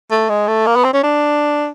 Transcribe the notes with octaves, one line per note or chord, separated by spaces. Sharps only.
A3
G#3
A3
A#3
B3
C4
C#4
D4